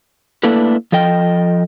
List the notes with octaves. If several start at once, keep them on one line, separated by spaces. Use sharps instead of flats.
A3 A#3 D4 E4 A4 B4
F3 A4 D#5 G5